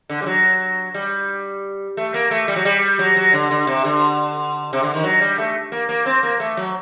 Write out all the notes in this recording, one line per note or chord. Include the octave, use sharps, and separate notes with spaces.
D3
G3
F#3
G3
A3
A#3
A3
G3
F#3
G3
F#3
F#3
D3
D3
C3
D3
C3
D3
D#3
F#3
G3
A3
A#3
A#3
C4
A#3
A3
F#3